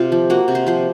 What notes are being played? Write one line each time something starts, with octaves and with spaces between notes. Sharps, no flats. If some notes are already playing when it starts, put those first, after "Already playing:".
Already playing: C3 F4
F3
A#3 F#4
C3
C5
F3 C5